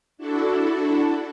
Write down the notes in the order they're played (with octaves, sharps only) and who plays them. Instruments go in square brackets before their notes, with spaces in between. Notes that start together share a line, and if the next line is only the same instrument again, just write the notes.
[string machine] D4 E4 F#4 A4